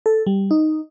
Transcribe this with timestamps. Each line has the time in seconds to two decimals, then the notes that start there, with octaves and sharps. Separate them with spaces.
0.06 A4
0.26 G3
0.51 D#4